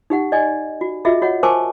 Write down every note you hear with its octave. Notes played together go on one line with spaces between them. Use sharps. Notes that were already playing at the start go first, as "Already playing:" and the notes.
D#4 G4 F#5
D5 D#5 G#5
F#4
F4 F#4 G#4 D#5 E5
F#4 C#5 D#5 F#5
A#4 C5 G#5 A5 C#6 D6